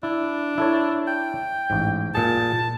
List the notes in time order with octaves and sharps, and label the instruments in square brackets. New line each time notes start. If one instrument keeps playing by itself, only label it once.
[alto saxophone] D4 [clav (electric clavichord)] E4
[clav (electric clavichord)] E4 A4 C#5
[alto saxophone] G5
[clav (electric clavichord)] A1 G#2
[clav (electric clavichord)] A#2 G#4 [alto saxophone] A5